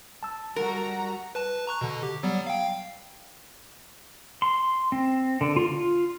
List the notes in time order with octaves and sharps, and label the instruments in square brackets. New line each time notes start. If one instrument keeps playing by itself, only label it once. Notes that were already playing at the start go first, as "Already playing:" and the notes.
[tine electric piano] A5 E6
[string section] G3 F#4 A#5 [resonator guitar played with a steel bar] A#4
[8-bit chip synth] B4 A5
A#5 C#6 F#6
B2 D3
G4
F#3 G3 B3
F5 G5
[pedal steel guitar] C6
C4
D3
F4
F4